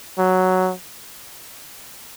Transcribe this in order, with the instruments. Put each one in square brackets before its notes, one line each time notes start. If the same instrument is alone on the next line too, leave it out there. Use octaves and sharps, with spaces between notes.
[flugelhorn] F#3